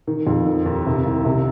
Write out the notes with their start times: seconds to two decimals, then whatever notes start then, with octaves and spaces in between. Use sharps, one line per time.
0.07 D#3
0.27 F2
0.46 D#3
0.66 D#2
0.87 C3
1.05 C2
1.25 C3